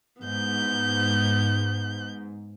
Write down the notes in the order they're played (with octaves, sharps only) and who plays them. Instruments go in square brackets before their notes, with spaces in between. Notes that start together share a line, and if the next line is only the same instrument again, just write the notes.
[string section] G#2 [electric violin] B3 G6